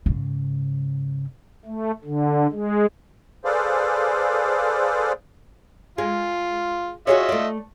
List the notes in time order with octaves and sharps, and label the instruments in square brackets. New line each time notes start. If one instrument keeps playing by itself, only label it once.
[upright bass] G#2 C#3
[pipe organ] A3
D3
G#3
[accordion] G#4 A4 B4 C5 D5 F5
[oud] G#3 [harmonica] F4
[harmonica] F4 D#5 E5 [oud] F#4 G#4 C#5
[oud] A3 D5